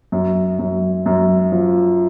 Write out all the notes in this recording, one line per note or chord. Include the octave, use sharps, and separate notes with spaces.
F#2
F#2
F#2
F3